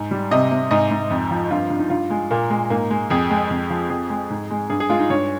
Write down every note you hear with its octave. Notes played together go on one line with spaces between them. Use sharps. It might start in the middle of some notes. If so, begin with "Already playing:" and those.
Already playing: G#2
G3
C3 D#5
C3
G#2 D#5
G#2
F2
F3
G2 F4
G2
D#4
G2 F4
G#3
A#2 A#3
G#3
G#2 A#3
G#3
F2 G#4
G#3
F2
F3
F2 G#4
G#3
G#2
G#3
G2 G#4
G#4
G#3 F4
D#4
G2 C#5